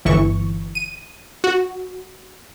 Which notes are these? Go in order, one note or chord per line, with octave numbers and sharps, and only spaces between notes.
G1 E3 C#6
D#7
F#4